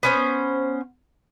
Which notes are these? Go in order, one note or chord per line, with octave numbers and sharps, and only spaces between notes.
B3 C#4 C5